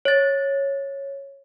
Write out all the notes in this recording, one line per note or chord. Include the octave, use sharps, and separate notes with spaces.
C#5 A6